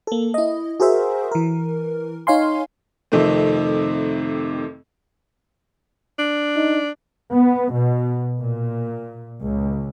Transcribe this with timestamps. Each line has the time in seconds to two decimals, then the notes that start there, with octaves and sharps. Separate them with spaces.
0.07 A#3 A4
0.34 E4 D#5
0.80 F#4 G#4 A#4 C5 E5
1.31 E3 A#4
2.27 D#4 C#5 F5 G#5 C6
3.12 F2 C3 D#3 A3 C4
6.19 D4
6.57 D#4
7.33 B3
7.73 B2
8.40 A#2
9.43 C#2